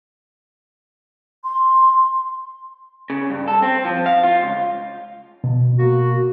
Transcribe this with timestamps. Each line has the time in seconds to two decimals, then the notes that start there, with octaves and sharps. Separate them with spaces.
1.42 C6
3.10 C#3
3.30 G2
3.48 A4
3.63 C4
3.85 F3
4.06 F5
4.23 F4
4.42 C#2
5.44 B2
5.79 A#3 F#4